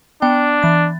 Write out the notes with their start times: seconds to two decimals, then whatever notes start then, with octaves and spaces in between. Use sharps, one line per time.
0.22 B3 D4 G5
0.63 E3 A6